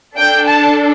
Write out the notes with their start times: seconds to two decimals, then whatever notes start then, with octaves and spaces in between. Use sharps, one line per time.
0.17 D4 A4 G5
0.48 A5